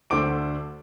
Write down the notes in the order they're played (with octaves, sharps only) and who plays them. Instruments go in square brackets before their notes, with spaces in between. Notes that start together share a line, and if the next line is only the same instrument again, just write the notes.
[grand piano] D2 D3 A3 C5 D6 D7